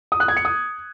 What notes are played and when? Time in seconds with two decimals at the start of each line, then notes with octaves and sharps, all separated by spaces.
0.12 D#6
0.20 F#6
0.28 G#6
0.37 C#7
0.45 D#6